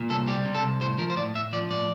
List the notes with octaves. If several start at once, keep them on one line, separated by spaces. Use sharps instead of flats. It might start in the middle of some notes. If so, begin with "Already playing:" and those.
Already playing: A#2
C2 A4
G3 G4
C3
A4
C2
A2 C5
F3 A#4
C5
A2 D5
A2 E5
F3 D5
A2 D5